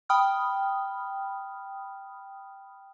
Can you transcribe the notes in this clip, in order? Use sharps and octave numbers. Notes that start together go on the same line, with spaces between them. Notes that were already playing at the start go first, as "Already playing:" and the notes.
G5 B5 D#6 F6